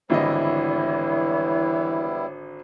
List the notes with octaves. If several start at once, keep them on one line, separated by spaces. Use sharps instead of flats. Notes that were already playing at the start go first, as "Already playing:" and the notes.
G#1 D3 E3 G3 B3 E4 C#5 D#5